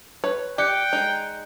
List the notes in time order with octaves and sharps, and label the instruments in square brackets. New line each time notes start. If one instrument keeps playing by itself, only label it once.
[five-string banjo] B4 C#5
[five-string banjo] G4 [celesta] D5 F#6 C#7 [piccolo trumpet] G5
[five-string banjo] G#3 D#4